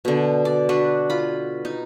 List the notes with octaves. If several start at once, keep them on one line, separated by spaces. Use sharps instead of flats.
B2 D3
D5
D4 F#4 B4
F4 B5
D#4